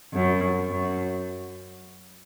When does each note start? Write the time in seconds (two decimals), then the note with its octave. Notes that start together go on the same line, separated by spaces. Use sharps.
0.13 F#2
0.71 F#2